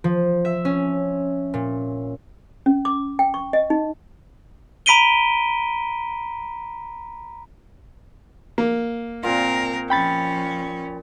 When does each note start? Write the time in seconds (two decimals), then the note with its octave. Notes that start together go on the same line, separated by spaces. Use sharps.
0.04 F3
0.45 E5
0.65 C#4
1.54 A#2
2.66 C#4
2.85 D6
3.19 G5
3.34 C#6
3.53 D#5
3.70 D#4
4.86 A#5 B5 B6 D7 D#7 G7
8.58 A#3
9.23 A#2 C4 F4 A#4
9.90 F3 C#4 G5 B5 A6